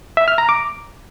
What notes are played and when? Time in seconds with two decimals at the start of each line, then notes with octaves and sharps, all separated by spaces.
0.17 E5
0.28 F6
0.38 A#5
0.49 D6